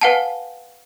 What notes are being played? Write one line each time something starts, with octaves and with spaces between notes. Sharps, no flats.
B4 F5 F#5 G#5 A5